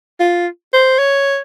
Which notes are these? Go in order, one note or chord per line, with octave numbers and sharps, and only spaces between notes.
F4
C5
C#5